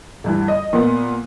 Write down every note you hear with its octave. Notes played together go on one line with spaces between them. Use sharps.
D2 G2 E3
D#5 D#6
A#2 A#3 B3